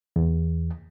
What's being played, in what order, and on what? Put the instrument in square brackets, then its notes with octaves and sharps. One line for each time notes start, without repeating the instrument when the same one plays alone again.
[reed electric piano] E2